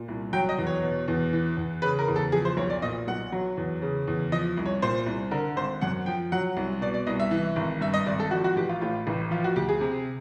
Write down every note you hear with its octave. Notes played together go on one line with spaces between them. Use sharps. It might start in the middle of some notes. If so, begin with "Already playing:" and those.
Already playing: A#2
C2
F#3 G5
D#5
E2
C#5
B2
E2
E3
E2
C#3 B4
A#4
E2
A4
F3 G#4
C5
B1 C#5
D5
A#2 D#5
B1 F#5
F#3
E2
C#3
E2
F3 D#5
C2
C#5
A#2 C5
C2
D3 A#4
G#1 C5
F#2 F#5
F3 G5
F#3 F#5
C2
B2 D5
D5
C2 D#5
E5
E3
G#1
G2 E5
D#5
G#1 D5
A4
F3 F#4
F#4
A1 G4
F4
A2 F4
A1
F3 F4
F#4
D2 G4
G#4
C3